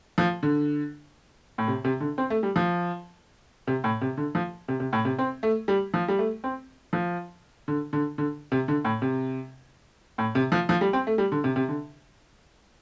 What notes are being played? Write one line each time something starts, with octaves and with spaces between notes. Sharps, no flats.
F3
D3
A2
C3
C3
D3
C4
A3
G3
F3
C3
A2
C3
D3
F3
C3
C3
A2
C3
C4
A3
G3
F3
G3
A3
C4
F3
D3
D3
D3
C3
D3
A2
C3
A2
C3
F3
F3
G3
C4
A3
G3
D3
C3
C3
D3